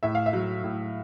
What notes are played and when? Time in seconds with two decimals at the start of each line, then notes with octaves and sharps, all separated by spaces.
0.03 A2 E5
0.15 F5
0.26 E5
0.33 F#3
0.64 A2